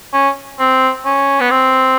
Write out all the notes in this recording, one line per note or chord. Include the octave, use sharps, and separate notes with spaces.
C#4
C4
C#4
B3
C4